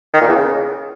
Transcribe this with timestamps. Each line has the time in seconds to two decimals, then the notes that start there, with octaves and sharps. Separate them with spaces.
0.14 D#3
0.21 A#2
0.29 E2
0.36 C#3